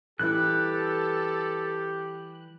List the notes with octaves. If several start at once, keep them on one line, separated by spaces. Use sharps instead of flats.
E3 G3 E4 G4 A4 F#6